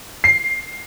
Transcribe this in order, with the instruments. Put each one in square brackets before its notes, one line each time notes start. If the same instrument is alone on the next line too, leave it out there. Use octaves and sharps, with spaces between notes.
[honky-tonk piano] C7